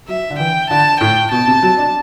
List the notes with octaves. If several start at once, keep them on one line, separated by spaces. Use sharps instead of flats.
F#3 E5
D3
E3 G5
D3 A5
A2 G5
B2 A5
C3
F#3
D4